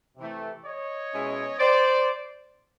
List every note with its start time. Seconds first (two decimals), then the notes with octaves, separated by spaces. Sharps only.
0.17 C3 E3 A3
0.64 C#5 D#5
1.12 B2 G#3 C#4 E4
1.59 C5 D5